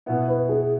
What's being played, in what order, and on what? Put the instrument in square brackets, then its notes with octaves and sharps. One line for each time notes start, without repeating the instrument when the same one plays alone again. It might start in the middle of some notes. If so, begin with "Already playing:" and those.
[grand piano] B2 B3 E4
[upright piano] B4
G#4